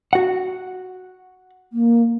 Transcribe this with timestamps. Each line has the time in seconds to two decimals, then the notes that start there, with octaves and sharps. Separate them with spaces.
0.13 F#4 F#5
1.73 A#3